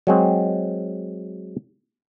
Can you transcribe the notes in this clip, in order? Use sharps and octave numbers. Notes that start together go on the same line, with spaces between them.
F#3 G#3 C4